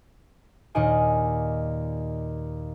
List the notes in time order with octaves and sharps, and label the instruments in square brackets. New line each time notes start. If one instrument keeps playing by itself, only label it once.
[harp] D#2 A#2 D#4 D5 D#5 G#5